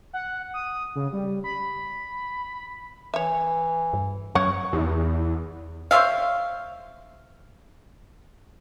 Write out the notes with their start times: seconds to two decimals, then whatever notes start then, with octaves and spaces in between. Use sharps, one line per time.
0.13 F#5
0.54 D#6
0.95 C#3
1.13 G3
1.44 B5
3.14 E3 C#5 E5
3.93 G2
4.35 F#2 C#5 F#5
4.73 E2
5.91 C5 C#5 E5 F5